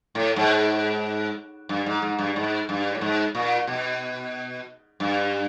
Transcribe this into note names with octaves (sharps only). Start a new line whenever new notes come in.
A2
G#2
G2
G#2
G#2
G2
G#2
G2
A2
G#2
A#2
B2
G2